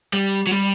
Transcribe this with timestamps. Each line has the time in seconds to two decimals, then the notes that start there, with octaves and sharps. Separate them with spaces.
0.13 G3
0.47 F#3
0.51 G3